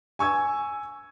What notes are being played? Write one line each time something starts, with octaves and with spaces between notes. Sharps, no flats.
G#5 C#6 E6 G#6